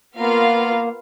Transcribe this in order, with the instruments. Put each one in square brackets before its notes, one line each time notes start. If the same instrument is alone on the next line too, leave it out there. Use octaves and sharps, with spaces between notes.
[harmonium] A#3 [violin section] B3 F4 A#4 F5